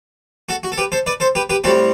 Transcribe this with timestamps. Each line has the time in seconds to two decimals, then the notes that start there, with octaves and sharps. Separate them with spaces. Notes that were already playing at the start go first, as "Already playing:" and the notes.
0.49 F#4 A4
0.63 F#4
0.72 A4
0.78 G4 B4
0.92 A4 C5
1.06 B4 D5
1.20 A4 C5
1.35 G4 B4
1.50 G4 B4
1.64 A2 G3 C4 F#4 A4